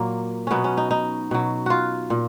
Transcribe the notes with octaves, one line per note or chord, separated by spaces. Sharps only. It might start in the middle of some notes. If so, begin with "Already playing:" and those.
Already playing: A#2 F#3 A#3
B2 F#3 B3 C#4
C#4
D#4
D#4
B2 F#3
F4 F#4
A#2